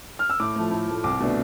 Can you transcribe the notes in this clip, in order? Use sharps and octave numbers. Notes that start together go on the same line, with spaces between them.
F6
E6
A2 D6
F3 A3
A2
F3 A3
C2 D6
B2 A3 D4